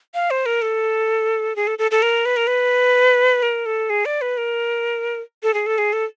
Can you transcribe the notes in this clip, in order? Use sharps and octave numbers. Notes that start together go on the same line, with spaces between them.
F5
C5
A#4
A4
G#4
A4
A4
A4
A#4
B4
A#4
B4
A#4
A4
G#4
D5
B4
A#4
A4
G#4
A4
G#4
A4